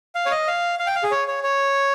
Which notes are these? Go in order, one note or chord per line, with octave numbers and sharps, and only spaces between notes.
F5
C#5
D#5
F5
F5
G5
F5
G#4
C#5
C#5
C#5